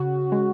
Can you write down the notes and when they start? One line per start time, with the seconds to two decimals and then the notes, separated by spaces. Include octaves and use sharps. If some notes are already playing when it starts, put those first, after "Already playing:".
Already playing: C#3 F#4
0.32 G#3